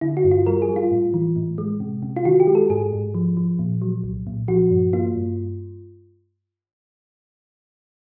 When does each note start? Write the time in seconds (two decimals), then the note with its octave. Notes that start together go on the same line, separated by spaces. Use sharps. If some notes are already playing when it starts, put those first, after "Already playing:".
0.01 D3 E4
0.17 F#4
0.24 G2
0.31 F4
0.46 G3 A#4
0.62 G#4
0.69 G3
0.76 F4
0.91 A2
1.14 E3
1.36 A2
1.58 G#3
1.80 C3
2.02 C3
2.16 F4
2.25 D#3 F#4
2.40 G4
2.47 G#3
2.55 A4
2.70 G#2 G#4
2.93 G#2
3.14 F3
3.37 F3
3.59 A#2
3.82 F#3
4.04 C2
4.27 A#2
4.48 F3 F#4
4.71 G2
4.93 A#3 F4
5.15 G2